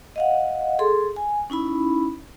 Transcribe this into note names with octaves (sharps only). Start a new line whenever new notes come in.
D#5 F5 F#5
G#4 A4 C6
G#5
C#4 D#4 E4 B5